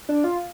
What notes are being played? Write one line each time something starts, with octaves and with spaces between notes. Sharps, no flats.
D4
F4